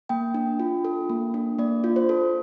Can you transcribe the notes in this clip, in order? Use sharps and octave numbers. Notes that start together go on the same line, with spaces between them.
A#3 G5
D4
F4
A4
A#3
D4
A#3 D5
F4
C5
A4